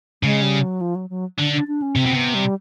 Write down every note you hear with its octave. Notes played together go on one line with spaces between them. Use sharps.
C#3 G#3
G3
F#3
F3
F#3
F#3
D3 D4
D4
D4
C#4
C3 C4
B2
C3 B3
G3